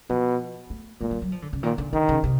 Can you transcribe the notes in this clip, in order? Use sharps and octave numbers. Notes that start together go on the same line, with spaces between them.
B2 F3
A3
A#2 G#3
G3
F#3
F3
D3
C#3
A#2 D#3
D3
D3 D#3
C#3
C3